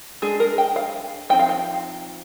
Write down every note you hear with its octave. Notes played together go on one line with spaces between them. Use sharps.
G#3 D4 G#4
A#4
G5
F5
F3 C4 D#4 G5
F5
G5